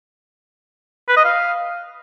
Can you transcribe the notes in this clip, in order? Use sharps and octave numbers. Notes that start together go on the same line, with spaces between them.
B4
D#5
F5